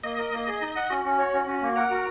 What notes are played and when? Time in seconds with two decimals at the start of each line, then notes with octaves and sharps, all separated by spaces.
0.03 A#3 D#5
0.18 A#4
0.32 A#3
0.47 G#4
0.61 D#4
0.76 F#5
0.90 C#4 F#4
1.05 C#4
1.19 C#5
1.33 C#4
1.47 C#4
1.62 A#3
1.76 A#4 F#5
1.91 F#4